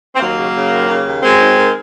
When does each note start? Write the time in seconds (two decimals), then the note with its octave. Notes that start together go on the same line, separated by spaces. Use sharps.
0.15 C4
0.20 D#2 F#3 A#3
0.37 C#3
0.55 C#3
0.71 D#2
0.88 C#3
1.05 D#2
1.23 F#2 G#3 C4
1.41 D#3
1.57 D#3